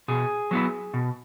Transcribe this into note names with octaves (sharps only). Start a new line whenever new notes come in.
B2 G#4
F#3 B3 E4
B2